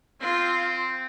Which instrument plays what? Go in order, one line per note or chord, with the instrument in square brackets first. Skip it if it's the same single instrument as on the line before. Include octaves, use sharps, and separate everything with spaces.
[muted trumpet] C4 [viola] F4